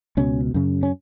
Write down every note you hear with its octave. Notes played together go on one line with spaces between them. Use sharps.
C#2 B2 C#4
F#2 C#3
C#4